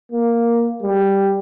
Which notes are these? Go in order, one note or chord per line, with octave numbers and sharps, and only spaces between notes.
A#3
G3